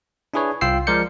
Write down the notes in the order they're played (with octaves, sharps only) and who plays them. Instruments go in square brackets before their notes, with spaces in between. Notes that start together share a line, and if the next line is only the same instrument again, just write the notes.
[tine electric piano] D4 E4 G#4 B4 C#5
C2 F4 G5 E6 C7
F3 G#3 A#4 D5 G6 C#7